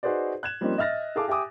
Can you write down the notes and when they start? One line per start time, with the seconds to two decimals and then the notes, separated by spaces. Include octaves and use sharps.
0.03 D#4 F#4 G#4 B4 C5 D5
0.43 F#6 G#6 E7
0.61 F3 G3 A#3 C4 C#4 D#4
0.78 D#5 E5 F6 A6 A#6
1.15 E4 G#4 A4 F5 A5 D6
1.28 G4 E5 G#5 D6 D#6